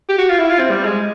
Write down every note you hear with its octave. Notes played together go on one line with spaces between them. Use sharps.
G4
F#4
F4
E4
F4
C4
G3
G#3